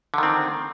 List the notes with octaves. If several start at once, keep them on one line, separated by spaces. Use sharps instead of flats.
D3 D#3 C4